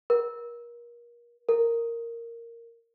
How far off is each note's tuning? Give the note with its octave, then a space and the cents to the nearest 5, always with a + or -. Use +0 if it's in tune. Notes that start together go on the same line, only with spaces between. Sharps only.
A#4 +30
A#4 -10